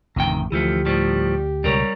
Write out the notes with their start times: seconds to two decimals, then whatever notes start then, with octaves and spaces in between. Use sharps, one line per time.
0.16 A1 F2 C3 D#3 G5
0.52 D2 E3 F3 A3 G4
0.86 A2 F3 G3
1.64 C#2 B2 G3 A#4 C#5